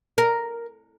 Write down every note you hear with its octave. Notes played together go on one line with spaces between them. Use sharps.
A#4